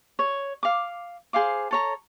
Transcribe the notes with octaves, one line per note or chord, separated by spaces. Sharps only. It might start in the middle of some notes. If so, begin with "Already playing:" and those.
C#5
F5 D6
G#4 C5 F5 D6
A4 C#5 A#5